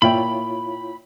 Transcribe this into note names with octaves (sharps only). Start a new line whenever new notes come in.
A#2 E4 F4 C#5 E5 G5 B5